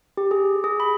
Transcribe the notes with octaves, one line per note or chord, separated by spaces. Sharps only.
G4
G#4
G#4
B5